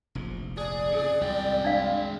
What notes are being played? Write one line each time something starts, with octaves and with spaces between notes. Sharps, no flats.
F1 A#1 G#2
G#4 D5
F2 C#3
C2 F#2 G#3 G5
D4 F5